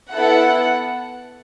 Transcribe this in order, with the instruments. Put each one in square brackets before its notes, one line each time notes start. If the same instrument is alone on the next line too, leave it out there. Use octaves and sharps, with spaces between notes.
[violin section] B3 E4 A4 F#5